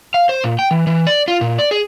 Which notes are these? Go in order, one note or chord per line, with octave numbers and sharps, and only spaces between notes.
F5
C5
A#2
G5
E3
E3
D5
F4
A#2
D5
G#4